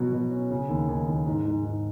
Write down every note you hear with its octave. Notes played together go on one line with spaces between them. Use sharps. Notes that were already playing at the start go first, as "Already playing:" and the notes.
Already playing: B2 F#3
B2
C#4
C#3
D#2
D#2
D#2
G#2
G#2
G#2